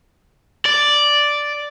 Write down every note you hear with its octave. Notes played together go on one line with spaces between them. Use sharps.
D5